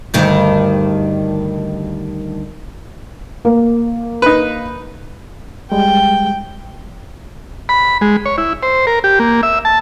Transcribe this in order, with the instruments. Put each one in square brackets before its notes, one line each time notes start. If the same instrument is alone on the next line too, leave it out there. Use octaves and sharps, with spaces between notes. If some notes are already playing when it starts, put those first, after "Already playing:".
[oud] D2 G2 D#3
[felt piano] A#3
[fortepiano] D#4 B4
[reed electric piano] G3 G#3 [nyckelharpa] G5
[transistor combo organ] B5
G#3
C#5
E4
C5
A#4
G4
A#3
E5
A5